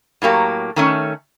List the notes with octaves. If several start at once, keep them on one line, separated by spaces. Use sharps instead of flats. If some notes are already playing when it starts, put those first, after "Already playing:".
A2 F#3 A#3 G4
D#3 A3 C#4